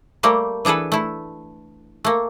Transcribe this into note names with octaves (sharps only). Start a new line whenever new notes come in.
G3 A3 A#3 G4
E3 D4 G#4 A4 B4
A3 E4
A3 A#3